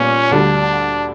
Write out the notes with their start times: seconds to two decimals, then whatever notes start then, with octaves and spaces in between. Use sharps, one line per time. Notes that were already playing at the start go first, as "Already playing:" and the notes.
Already playing: A#2 G3 B3 C#4
0.31 D2 D3 G3 D4